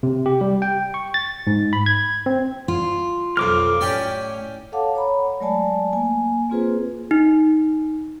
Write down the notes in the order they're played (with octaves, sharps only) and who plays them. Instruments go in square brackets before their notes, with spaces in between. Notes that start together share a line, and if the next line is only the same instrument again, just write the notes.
[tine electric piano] C3
G4
G3
G5
C#6
A6
G#2
B5
G#6
C4
[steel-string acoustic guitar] F4
[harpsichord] B1 F2 [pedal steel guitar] D6 F6
[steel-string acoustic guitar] A2 [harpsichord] C#4 G4 D5
[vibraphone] A4 C#5 F5 F#5 A5 D6
C#5 A#5 B5
F#3 G#3 A3 D5 G#5 A5
A#3 G#5
A#3 C4 F4 G#4 B4 C5
[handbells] D#4